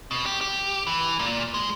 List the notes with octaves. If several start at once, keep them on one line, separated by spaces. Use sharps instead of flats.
B2
G4
G4
E3
A#2
G#3